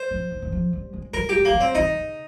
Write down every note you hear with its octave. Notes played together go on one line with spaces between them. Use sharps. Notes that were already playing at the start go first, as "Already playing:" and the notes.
Already playing: C5
F3
D#3
D#3
F3
G3
G#3
G3 A#4
G3 G4
A#3
G#3
G3
C4
D#3 D#4
C#3